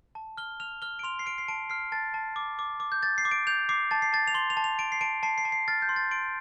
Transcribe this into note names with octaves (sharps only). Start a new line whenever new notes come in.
A5
F6 G7
F6 F7
F6 G7
D7
C6 F7
C7
F6 D7
C7
A5 D7
F6 C7
A5 A6
A5
D6
D6
D6
G6
G6 A6
C7
D6
D7
G6 F7
D6 C7
A5 A6
C7
A5 A6
F7
C6 G7
F7
A5
F7
A5 D7
C7
A5 D7
A5 C7
C7
A5
C7
F6 A6
G6
C6
A6
C6 D7